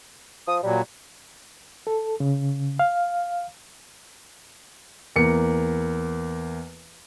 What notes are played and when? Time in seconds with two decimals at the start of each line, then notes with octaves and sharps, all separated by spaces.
0.48 F3 D#6
0.63 A#2 F#3 G3
1.87 A4
2.20 C#3
2.79 F5
5.16 E2 A#3 C#7